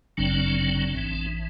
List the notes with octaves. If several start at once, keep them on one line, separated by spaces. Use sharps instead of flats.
G1 F#2 C#3 F#3 C4 D4
A1 G#2 E3